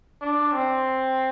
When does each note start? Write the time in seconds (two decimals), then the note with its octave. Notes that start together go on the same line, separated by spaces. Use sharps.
0.21 D4
0.52 C4